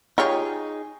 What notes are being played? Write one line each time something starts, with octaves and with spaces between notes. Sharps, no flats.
D#4 F4 G4 G#4 C#5